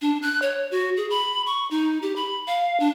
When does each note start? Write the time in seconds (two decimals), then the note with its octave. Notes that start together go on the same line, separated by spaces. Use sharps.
0.02 D4
0.22 F#6
0.42 C#5
0.71 F#4
0.97 G#4
1.10 B5
1.46 C#6
1.71 D#4
2.02 G4
2.16 B5
2.47 F5
2.80 D4